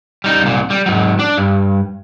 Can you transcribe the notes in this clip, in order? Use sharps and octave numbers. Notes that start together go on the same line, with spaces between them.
G3 D#4
C2 A#2
G3
G#2 F#3
D4
G2